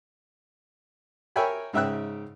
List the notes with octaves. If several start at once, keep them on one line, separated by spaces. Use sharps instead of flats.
A#4 C#5 E5 G5 G#5 B5
G#2 C#3 E5 G5 E6 F#6